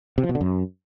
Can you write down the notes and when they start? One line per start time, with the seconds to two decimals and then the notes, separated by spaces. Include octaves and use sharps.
0.18 C3
0.23 F3
0.29 B2
0.35 D3
0.41 F#2